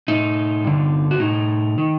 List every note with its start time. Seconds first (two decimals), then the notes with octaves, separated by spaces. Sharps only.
0.08 A2 D#4
0.64 G2 D3
1.11 F#4
1.20 A2 D#4
1.78 D#3